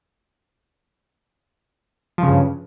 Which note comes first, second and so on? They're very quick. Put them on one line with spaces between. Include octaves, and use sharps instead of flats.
F3 C#3 G2